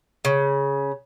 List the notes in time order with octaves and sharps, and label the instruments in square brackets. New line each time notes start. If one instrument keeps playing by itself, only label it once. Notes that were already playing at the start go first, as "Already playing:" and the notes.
[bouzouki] C#3